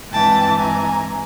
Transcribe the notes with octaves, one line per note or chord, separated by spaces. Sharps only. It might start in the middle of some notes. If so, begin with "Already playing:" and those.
G2 E3 G#3 C4 G5 A5
G#5 A#5